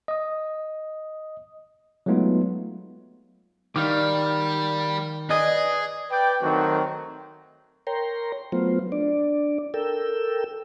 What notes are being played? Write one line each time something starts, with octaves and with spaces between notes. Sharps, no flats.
D#5 D#6
F#3 G#3 A3 B3 D#4 F4
D#3 G3 D5 F5 D6
G#4 B4 D5 D#5 G#5
B4 D5 G5
D#3 F#3 A3 C4 F#4
A#4 C#5 G5 A#5 C6
F#3 A3 B3 F4 C5
D4 D5
A4 A#4 G5 E6